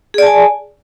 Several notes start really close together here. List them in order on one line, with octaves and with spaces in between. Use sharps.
G#4 D5 A5 G#5